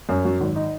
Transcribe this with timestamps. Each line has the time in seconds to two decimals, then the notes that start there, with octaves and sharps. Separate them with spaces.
0.09 F#2
0.25 F#3
0.41 G#1
0.56 D#4